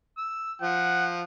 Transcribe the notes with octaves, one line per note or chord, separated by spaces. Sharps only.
E6
F3 F#5